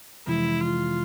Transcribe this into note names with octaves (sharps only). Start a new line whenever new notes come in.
F2 C3 E3 G#3 E4
F4